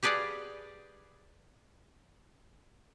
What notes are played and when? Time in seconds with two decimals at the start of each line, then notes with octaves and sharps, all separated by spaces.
0.03 G4 G#4 B4 D5 F5 F#5